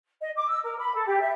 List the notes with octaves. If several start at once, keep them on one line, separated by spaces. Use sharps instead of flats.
D#5
D6
E6
A#4
B5
A4
G4
E5